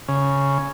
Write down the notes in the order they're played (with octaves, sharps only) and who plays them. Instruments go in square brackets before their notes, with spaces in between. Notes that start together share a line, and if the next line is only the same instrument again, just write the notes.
[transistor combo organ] C#3